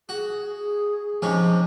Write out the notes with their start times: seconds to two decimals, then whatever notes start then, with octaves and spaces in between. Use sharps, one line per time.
0.09 F#4 G#4
1.22 G#2 C3 F3 C#4